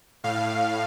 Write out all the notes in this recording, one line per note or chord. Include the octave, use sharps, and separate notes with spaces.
A2 F5